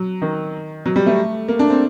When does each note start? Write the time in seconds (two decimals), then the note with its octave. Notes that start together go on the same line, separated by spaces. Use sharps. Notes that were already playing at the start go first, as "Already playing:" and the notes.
Already playing: F#3
0.22 D#3
0.86 F#3
0.96 G3
1.06 A3
1.48 A#3
1.59 D4
1.70 C4